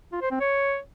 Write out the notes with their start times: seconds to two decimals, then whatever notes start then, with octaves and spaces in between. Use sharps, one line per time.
0.12 F4
0.22 C5
0.31 C4
0.40 C#5